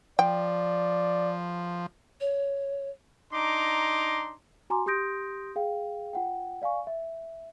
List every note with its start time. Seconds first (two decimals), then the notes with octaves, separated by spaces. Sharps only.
0.19 F3 D5 G5
2.21 C#5
3.33 D4 D#4 A#5 C6 D6
4.70 F#4 G#5 A#5 C6 D6
4.86 G4 C6 D#6 G6 A#6 D7
5.56 G#4 F5 G5
6.13 F4 F#5 G5
6.62 D5 F5 G#5 C#6
6.87 E5